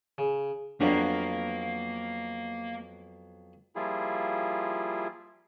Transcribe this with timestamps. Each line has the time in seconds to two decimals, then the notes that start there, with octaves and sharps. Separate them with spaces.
0.18 C#3
0.81 F2 F#3 A#3 B3 D4 A#5
3.76 F3 G3 A#3 E4 F4 G#4